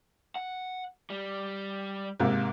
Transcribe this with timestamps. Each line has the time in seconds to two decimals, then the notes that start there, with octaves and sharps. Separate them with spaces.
0.36 F#5
1.10 G3
2.20 G#2 C3 A#3